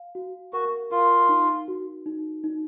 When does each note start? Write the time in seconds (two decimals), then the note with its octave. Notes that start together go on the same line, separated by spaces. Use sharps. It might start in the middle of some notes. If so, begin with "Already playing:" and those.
Already playing: F5
0.15 F#4
0.53 F#4 A#4
0.91 F4 A#4
1.29 D#4
1.68 F#4
2.06 D#4
2.44 D#4